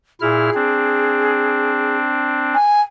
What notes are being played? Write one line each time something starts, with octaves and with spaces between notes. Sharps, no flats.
A#2 E4 G#4 F6
C4 D4
G#5